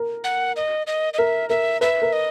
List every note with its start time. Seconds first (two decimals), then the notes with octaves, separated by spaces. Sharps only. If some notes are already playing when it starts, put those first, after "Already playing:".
Already playing: A#4
0.24 F#5
0.56 D#5
0.87 D#5
1.14 D#5
1.18 A#4 E5
1.49 A#4 E5
1.81 B4 E5
2.02 A#4
2.13 D#5